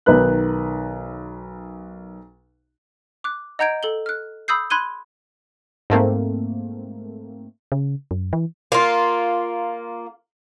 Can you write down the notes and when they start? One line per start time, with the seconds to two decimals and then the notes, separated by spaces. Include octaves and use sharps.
0.06 B1 D#3 B4 F#6
3.24 D6 F#6
3.59 D#5 F#5 A#5 G6 G#6 D7
3.83 A4 F#7 G7
4.06 F6 F#6
4.48 B5 D#6 E6 G6 C7
4.70 B5 C6 F#6 G#6 D#7 G7
5.90 G#2 A3 A#3 C4
7.72 C#3
8.11 F#2
8.33 E3
8.72 A#3 F4